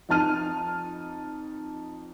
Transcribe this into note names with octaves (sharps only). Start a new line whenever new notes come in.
F2 D#4 A5 F6 D#7